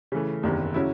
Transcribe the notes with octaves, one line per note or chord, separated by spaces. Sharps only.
C#3 E3 A3
F#1 E2 C3 D#3
C#3 F#3 C#4 E4